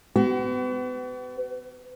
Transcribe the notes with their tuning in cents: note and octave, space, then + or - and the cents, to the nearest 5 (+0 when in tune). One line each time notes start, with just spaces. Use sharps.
B3 +35 F#4 +45